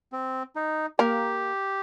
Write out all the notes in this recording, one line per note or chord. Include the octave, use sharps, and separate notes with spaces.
C4
D#4
A#3 G4 A#4